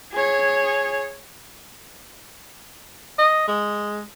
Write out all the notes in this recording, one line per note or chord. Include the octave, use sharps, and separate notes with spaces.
G#4 C#5
D#5
G#3